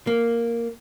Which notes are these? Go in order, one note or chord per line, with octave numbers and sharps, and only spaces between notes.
A#3